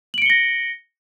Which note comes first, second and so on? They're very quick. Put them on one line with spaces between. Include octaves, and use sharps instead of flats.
F#7 D7 C#7 G7 A#6